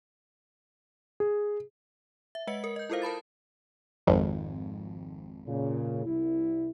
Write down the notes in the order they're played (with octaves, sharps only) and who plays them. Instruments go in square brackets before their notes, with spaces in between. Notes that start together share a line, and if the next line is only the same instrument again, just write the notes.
[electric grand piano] G#4
[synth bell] E5
G#3 B4 D#5 F#5 C#7
A#4
D#5 G6
E4 F4 A4 A#4 C5 F5
A#4 A5 B5 A6
[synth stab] G#1 F2
[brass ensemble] A#2 C#3
C2 E4